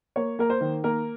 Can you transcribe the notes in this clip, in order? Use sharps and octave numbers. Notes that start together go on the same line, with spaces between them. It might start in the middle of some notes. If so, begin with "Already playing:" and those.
A#3 C#5
A#3 A#4
C5
D#3
A#3 A#4